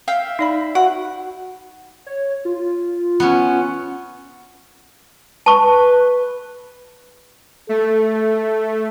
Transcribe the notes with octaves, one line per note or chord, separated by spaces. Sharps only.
E5 F5 G5
D#4 D5 B5
F#4 F#5
C#5
F4
B3 C#4
B4 A5 C#6
A3 A4